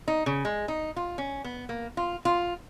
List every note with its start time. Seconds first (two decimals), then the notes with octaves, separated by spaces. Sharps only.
0.08 D#4
0.26 C#3
0.45 G#3
0.68 D#4
0.96 F4
1.18 C#4
1.44 B3
1.69 A#3
1.97 F4
2.25 F4